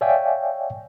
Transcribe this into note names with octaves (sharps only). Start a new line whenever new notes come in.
C#5 D5 E5 F5 G5 G#5